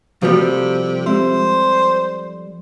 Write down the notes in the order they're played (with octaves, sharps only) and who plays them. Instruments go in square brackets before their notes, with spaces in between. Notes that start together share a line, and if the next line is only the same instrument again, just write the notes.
[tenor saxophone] C3 [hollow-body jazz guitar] F3 G3 A3 [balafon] F#4 B4
[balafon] G#3 C4 G4 [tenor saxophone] C5